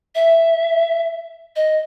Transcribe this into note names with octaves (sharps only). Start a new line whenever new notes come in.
E5
D#5